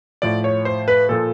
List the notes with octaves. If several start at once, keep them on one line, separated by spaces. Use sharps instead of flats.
A2 F3 D5
C#5
C5
B4
A#2 F3 A4